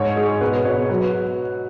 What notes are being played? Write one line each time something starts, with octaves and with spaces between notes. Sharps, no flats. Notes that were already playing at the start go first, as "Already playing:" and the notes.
Already playing: G#2 C#5
G#3 G#4
B2 B4
B2 C#5
F#3 B4